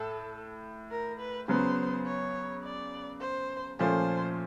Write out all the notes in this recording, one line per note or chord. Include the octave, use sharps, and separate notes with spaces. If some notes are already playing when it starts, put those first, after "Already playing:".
Already playing: A2 A4
A#4
B4
C#3 F#3 B3 C5
C#5
D5
C5
A#2 F3 A3 C#4 F4 C5